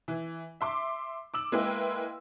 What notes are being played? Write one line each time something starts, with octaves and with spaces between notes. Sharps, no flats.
E3
E5 C6 D6
D6 E6 F#7
G#3 A#3 E4 B4 G5